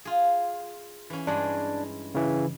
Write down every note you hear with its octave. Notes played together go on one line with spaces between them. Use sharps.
F4 G#4
E3 C#4
G2 G#3 D4 G#4
C#3 E3